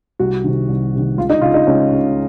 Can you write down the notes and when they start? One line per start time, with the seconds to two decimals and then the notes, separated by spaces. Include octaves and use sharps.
0.19 C2 F#4
0.44 C3 D#3
0.69 C2
0.94 C3 D#3
1.17 C#2 F4
1.30 D#4
1.41 C#3 F4
1.54 D#4
1.67 C#2 C#4
1.92 C#3